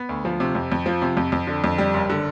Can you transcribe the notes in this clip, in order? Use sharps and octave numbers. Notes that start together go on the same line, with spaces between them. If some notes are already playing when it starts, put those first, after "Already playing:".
Already playing: B3
D2
F3
C3
F2
F2
F3
C3
F2
F2
D3
F2
G3
F#1
D3